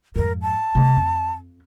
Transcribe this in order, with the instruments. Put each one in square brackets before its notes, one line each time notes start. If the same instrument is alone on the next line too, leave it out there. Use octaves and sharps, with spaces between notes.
[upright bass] F2 G#2 [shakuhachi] A#4
[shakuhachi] A5
[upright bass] C3 A3
F2